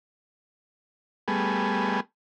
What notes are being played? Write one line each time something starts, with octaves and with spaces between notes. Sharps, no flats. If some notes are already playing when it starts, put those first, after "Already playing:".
G3 A3 B3 G#4